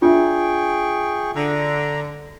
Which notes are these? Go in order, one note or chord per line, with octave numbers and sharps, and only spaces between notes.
D4 F4 G#4 E5 G5 C#6
D3 A#5